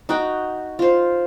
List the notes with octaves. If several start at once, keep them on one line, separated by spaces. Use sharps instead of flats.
D#4 F#4 D#5 G5
F4 C5